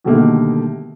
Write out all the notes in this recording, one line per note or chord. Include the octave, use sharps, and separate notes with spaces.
B2 D3 D#3 G3 A3 A#3